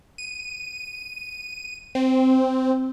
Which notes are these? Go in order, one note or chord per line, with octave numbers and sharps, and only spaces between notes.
D#7
C4